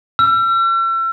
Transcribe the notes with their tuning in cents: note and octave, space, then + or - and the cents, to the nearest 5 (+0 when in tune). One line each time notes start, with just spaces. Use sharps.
E6 +40